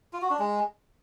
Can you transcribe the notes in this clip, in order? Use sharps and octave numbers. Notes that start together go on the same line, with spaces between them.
F4
F#4
D4
G#3